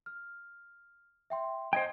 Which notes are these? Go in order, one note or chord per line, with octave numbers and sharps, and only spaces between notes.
F6
E5 G5 C6
C5 D#5 G5 G#6